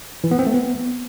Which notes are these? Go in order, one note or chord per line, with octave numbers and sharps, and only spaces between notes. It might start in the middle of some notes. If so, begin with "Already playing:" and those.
E3
B3
C4
A3
B3